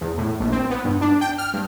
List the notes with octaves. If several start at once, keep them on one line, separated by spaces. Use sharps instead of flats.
E2
A2
A#1
C4
B3
G2
D4
G5
F6
G2